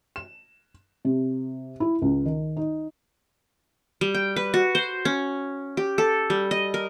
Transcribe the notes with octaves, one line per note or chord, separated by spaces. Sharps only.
E7
C3
E4
C#2
D#3
D#4
G3
G5
B4
F#4
C5
C#4
G4
A4
G3
D#5
A#4